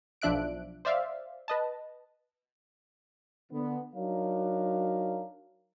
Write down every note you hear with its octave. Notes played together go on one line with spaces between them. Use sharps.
B1 F3 D4 E5 F#6 D7
C5 D5 E5 F5
B4 D#5 A5
D3 B3
F#3 D4 D#4 A#4 C#5 F5